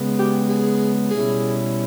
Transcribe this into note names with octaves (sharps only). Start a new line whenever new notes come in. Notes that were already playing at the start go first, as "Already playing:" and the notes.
Already playing: C#3 G#3 B3
G4
G#4
B2 G3 C#4 E4 G#4